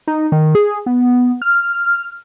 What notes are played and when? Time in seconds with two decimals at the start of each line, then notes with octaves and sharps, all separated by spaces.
0.07 D#4
0.32 D#3
0.55 G#4
0.86 B3
1.42 F6